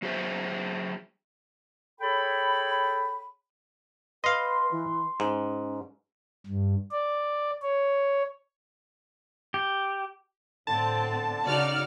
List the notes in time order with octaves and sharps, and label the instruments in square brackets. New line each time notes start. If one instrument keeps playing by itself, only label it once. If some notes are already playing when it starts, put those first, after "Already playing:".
[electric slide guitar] F#3 F#4 G#4 C5 E5
[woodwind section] G#4 A4 C#5 G5 B5
[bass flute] B4 [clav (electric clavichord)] D#5 F5 [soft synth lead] C6
[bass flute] E3
[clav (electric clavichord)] G#2 [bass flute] C#4
[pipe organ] G2
D5
C#5
[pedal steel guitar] G4
[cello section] A2 C4 [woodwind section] D3 [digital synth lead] A5
[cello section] C#3 D#4 F#4 [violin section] D5 F6